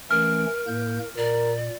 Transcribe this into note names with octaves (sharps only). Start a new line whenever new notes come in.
E3 A3 C#4 A#4 F6
A2 A#3 G6
A#2 A#4 D5